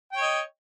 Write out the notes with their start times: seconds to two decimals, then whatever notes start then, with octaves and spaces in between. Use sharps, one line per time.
0.12 G5
0.17 C#5
0.21 D#5